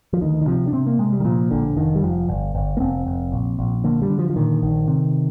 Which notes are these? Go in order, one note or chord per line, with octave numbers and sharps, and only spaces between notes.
F3
D2 D#3
D#3
C3 F3
D4
C3 C4
A#3
C3 G#3
G3
D#3
A#2 F3
A#1 D3
F1 D#3
G3
F1 F3
G1
G1
A#3
F1 C4
F1
A#1
A#1
D3 A#3
G3
D3
F3
F3
A#2 D#3
A#1 D#3
C3